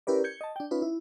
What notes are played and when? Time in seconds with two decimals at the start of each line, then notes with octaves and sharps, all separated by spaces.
0.07 C#4 E4 G4 A#4 B4 D5
0.24 G6 G#6 C#7
0.41 D#5 A5
0.56 D4 G5
0.71 C#4 D#4 F4 B4
0.82 E4